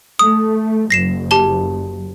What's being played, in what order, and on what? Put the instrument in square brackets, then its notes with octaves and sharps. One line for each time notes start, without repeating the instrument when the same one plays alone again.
[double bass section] A3 [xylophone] D#6
[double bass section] F#1 [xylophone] A#6 C7 E7
[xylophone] G4 A5 G7